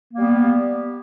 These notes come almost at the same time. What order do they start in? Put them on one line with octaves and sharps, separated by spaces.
A#3 G3 B3